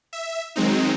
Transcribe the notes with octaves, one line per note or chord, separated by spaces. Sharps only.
E5
D#3 F#3 G#3 C4 D#4